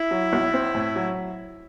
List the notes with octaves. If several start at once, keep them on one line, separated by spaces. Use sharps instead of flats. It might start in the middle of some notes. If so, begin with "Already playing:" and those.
Already playing: E4
F#3
B1
C4
A2
F#3